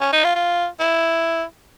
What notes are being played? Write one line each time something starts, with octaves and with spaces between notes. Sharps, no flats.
C#4
D#4
F4
F4
E4